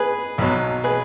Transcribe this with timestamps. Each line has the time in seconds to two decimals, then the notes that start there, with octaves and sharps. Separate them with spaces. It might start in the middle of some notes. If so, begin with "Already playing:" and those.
Already playing: G#4 B4
0.38 B1 B2 F#3
0.84 G#4 B4